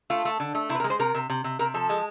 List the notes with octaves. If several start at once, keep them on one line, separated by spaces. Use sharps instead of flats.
A3 F4
A3
D3
A3
C3 E4
B4
A#4
G#3
C5
C3 A#4
C3
C3
C3
C3 A#4
F3 A4
G#3